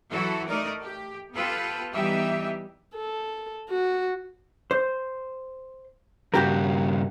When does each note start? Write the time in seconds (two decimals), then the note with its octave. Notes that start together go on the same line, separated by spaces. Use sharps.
0.11 E3 F#3 E4 F#4 A4
0.47 A3 D#4 A#4 D5
0.82 G4
1.34 B3 F4 G4 A4 B4
1.94 E3 G3 B3 D#4 G4 E5
2.95 A4
3.70 F#4
4.71 C5
6.34 G2 C#3 F#4 G4 A#4